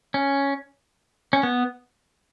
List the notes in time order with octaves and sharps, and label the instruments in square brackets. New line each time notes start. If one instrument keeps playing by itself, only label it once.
[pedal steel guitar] C#4
C#4
B3